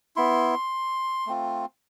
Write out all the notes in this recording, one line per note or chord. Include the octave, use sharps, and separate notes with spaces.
B3 E4 C6
A3 C4 F4